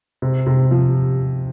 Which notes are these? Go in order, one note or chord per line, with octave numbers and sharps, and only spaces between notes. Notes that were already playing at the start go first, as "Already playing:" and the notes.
C3
C3
F3